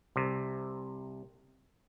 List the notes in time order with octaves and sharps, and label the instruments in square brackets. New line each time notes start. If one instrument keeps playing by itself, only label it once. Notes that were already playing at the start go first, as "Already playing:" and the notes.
[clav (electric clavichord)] C2 C3